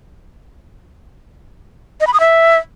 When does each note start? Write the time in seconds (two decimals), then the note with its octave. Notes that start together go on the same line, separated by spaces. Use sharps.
2.01 D#5
2.07 B5
2.14 D#6
2.20 E5